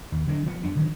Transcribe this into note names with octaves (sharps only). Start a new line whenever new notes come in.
D#2
D3 F#3 D4
F3 F#3 B3
F#2 B3 D4
D3 D#3 F3 F#3